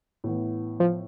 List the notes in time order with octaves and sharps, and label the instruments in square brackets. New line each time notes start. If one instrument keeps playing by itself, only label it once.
[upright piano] A2 E3 B3 E4
[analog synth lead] F3